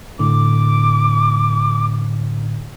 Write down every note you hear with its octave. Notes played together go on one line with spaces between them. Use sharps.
A2 D3 D6